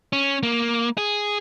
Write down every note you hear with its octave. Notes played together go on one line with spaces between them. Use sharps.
C#4
A#3
G#4